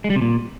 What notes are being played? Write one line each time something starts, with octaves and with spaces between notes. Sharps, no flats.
G#3
G3
C3
A#2